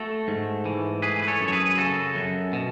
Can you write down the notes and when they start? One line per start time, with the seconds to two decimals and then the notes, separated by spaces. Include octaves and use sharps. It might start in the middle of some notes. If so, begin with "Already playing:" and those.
Already playing: A3 F#4 A4
0.28 G#2
0.66 E3
1.02 A3 G#4 B4
1.23 B4
1.27 A4 C#5
1.41 F#2
1.48 C#5
1.52 G#4 B4
1.78 C#3 F#4 A4
2.15 F#2
2.53 B2